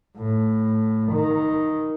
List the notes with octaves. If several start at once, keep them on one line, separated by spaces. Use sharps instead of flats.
A2
D#3